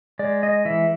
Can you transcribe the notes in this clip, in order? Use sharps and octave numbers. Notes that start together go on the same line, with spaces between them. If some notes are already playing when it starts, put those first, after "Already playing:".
G#3 D5
D#5
E3 E5